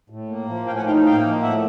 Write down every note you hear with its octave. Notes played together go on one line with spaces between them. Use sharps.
A2
A#3
F3
A2 F5 G5
F#5 G#5
D#4 F5 G5
A#3 F5 G5
F3
A2 E5 F#5